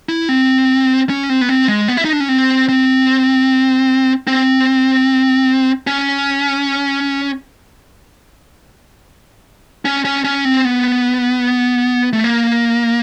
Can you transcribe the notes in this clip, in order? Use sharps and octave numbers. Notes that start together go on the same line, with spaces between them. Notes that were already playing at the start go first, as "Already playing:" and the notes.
E4
C4
C#4
C4
B3
C4
G#3
B3
E4
D#4
D4
C#4
C4
C4
C4
C#4
C#4
C#4
C#4
C4
B3
A3
A#3